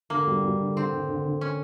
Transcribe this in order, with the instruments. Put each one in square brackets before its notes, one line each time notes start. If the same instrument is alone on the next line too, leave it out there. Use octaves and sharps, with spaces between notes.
[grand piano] D3 [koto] A#3
[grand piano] G3
G3
D3
[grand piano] D3 [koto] C4
[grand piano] D3
D3
D3
[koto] C#4